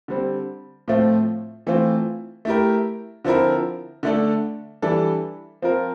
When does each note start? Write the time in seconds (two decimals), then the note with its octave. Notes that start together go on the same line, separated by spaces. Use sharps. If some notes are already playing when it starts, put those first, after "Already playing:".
0.08 D3 G3 C4
0.88 A2 F3 A3 C4 F4
1.67 E3 A3 C4 F4
2.45 A3 E4 G4 A#4
3.25 D3 F3 C4 E4 A#4
4.03 D3 A3 D4 A4
4.82 E3 G3 D4 A4
5.62 F3 C4 F4 A#4